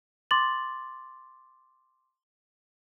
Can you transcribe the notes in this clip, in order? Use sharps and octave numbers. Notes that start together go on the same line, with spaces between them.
C6 D6 A6 F#7